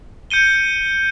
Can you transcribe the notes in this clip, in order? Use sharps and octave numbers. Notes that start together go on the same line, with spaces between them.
G6 C#7 D#7 G7